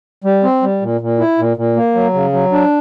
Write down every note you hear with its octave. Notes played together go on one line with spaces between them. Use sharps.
G3
C4
G3
A#2
A#2
E4
A#2
A#2
A#3
F#3
C#3
F#3
D4